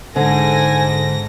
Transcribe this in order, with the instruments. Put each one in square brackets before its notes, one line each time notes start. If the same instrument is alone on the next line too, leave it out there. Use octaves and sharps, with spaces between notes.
[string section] G#2 A#6 [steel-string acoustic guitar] D3 [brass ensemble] A4 G#5 [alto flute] C5